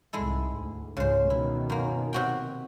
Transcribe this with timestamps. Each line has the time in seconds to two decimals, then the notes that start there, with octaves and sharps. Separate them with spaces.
0.13 C2 G#2 G#3 E4 A4
0.57 D2
0.97 C#2 G#2 C#3 G#3 C5
1.30 B2 D#3 E4
1.70 F#2 A#3
2.13 C3 F#4 G5